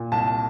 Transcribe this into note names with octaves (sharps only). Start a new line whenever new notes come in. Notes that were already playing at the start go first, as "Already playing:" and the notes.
Already playing: A#2
C2 A5